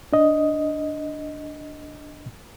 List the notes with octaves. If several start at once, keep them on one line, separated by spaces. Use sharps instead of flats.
D4 D#5